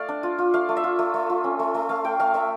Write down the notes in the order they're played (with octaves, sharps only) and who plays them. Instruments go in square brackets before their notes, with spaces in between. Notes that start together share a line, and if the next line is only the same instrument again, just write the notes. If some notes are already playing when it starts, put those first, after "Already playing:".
Already playing: [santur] A3 D5 F5
D4
F4
F4
A3 F5
A3
E5
F4
A3
A3
F4
C#4
A3
A3
A3 F5
A3 G5
A3 F5
A3 E5